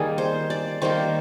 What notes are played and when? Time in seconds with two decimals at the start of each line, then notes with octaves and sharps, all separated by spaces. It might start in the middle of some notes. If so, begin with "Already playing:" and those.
Already playing: D#3 G3 A#3 G#4
0.18 C5
0.50 D5
0.82 D#3 G3 A#3 C5